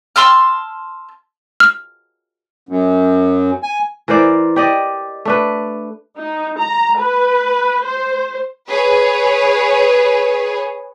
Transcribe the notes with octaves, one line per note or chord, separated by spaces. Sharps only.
A5 C6 E6 F6
F6
F#2
G#5
E3 A#4 C5 D5
G4 D5 D#5
A3 D4 B4
D#4
A#5
B4
C5
G#4 B4 C#5